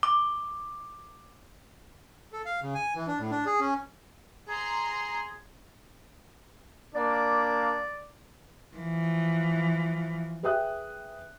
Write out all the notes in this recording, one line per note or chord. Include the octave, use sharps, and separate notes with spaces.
D6
A4
F5
C#3
G#5
E3
D4
A2
D4
G#4
C#4
G#4 A#5 C6
A#3 D4 D5
E3 F3
G#4 B4 E5 G5 D#6 F#6